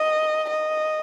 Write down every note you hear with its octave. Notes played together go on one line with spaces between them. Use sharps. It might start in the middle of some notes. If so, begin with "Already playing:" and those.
Already playing: D#5
D#5